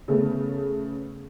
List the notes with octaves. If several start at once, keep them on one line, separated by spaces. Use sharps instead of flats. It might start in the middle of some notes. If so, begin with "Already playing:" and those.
C#3 A3 B3